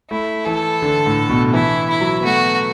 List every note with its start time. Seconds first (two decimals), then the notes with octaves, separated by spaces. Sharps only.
0.10 A3 E4
0.46 E3 A4
0.82 D3
1.06 A2
1.30 B2
1.54 E3 E4
1.89 E4
2.01 F#3
2.20 B3
2.24 A3 F#4